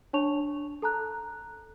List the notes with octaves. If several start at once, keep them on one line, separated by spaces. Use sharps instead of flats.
D4 C#5 A5 C#6 F7
A4 A5 A#5 F#6